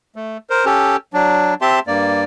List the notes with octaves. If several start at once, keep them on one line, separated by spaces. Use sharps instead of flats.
A3
A#4 C5
C#4 G4 A4
F#3 D4
C4 G4 E5 A5 C6
G2 A#3 D5